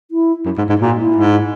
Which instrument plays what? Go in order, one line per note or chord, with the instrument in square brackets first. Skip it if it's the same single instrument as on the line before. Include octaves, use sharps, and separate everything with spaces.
[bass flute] E4
[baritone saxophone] F#2
G#2
G#2
[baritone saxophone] A#2 [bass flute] F#4
[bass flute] E4
[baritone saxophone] G#2